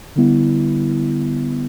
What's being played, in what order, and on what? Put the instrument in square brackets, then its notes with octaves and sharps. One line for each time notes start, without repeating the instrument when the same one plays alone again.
[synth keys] D3 G3 B3 E4